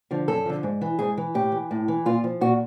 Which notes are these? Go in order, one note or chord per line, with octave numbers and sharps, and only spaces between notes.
D3 F3
F#2 A4
D3 F3
G#2
E3
G#2 G#4
E3
A2 G4
E3
A2
E3
A#2 F4
F3
A#2 F#4